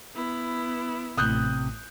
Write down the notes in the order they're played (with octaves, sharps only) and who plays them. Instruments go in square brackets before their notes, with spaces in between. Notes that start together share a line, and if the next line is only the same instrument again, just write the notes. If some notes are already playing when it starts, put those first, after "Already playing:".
[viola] B3 E4
[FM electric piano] A1 A2 [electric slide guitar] C3 [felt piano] D#6 F#6 G6